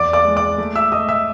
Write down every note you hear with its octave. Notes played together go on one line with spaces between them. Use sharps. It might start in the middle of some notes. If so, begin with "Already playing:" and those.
Already playing: E2 D5 D6
D5 D6
G#3
D5 D6
A3
E5 E6
A3 D#5 D#6
E5 E6